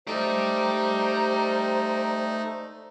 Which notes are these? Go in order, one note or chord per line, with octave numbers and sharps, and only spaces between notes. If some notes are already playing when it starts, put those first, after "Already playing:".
A3 D#4 G4 C5 D5 A#5